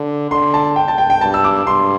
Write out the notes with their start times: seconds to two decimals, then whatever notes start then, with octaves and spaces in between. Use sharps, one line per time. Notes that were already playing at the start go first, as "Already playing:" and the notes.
Already playing: D3
0.31 D3 C6
0.54 A5
0.76 G5
0.88 A5
0.98 G5
1.10 G5
1.21 G2 A5
1.34 E6
1.44 D6
1.66 G2 C6